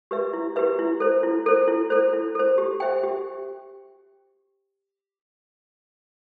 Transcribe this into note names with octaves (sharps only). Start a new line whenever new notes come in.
G4 B4 E5
E4
G4 B4 E5
E4
A4 C5
E4
A4 C5
E4
A4 C5
E4
A4 C5
G4
C5 E5 G5
G4